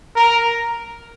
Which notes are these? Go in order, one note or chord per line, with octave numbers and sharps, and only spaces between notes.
A#4